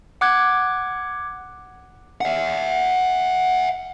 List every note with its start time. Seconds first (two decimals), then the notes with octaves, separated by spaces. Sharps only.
0.21 F#5 D6 F#6 G#6
2.21 E5 F#5